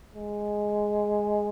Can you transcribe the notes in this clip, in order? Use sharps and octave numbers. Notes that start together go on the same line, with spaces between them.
G#3